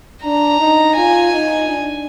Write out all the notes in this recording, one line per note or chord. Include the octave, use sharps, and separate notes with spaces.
D4 A#5
D#4
F4 G#5
D#4
D4